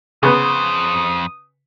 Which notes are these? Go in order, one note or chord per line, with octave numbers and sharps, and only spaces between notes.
F2 C#3 B3 B4 C5 D#6